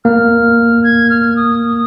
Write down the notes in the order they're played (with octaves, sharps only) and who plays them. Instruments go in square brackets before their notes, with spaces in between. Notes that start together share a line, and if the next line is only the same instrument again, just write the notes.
[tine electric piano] A#3 [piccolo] F6
[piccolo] G#6
F6
D#6